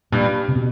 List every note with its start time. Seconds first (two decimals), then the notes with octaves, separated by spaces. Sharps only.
0.12 G2 A#2
0.48 C3
0.56 B2